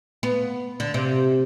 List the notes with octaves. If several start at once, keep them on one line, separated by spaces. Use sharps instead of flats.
B3
D3
C3